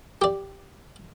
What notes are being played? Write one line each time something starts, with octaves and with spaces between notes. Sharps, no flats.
G4 D5